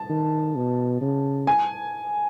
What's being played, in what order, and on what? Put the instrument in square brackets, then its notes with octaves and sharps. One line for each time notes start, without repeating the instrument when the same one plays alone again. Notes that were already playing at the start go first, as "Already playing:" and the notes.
Already playing: [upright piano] A5
[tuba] D#3
B2
C#3
[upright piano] G#5